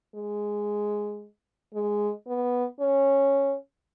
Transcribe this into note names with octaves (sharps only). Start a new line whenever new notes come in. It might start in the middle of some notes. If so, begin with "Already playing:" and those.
G#3
G#3
B3
C#4